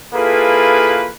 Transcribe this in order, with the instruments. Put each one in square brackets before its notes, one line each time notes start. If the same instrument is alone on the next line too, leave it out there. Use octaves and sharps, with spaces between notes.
[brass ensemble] A#3 E4 F4 G#4 A4 B4